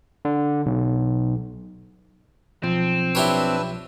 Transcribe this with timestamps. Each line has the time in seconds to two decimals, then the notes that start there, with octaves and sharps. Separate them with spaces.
0.25 D3
0.66 B1
2.63 B1 F3 C4
3.15 D4 E4 G4 B4 C#5 E6